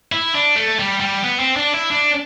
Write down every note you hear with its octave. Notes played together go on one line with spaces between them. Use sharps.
E4
D4
A3
G3
G3
B3
C4
D4
E4
D4